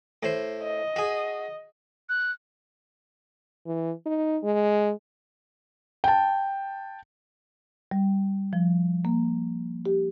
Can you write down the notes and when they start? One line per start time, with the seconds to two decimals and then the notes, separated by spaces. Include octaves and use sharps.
0.23 A2 C5
0.62 D#5
0.96 F#4 G#4
2.09 F#6
3.66 E3
4.06 D#4
4.44 G#3
6.04 G5 A5
7.91 G3
8.53 F3
9.05 A#3
9.85 G4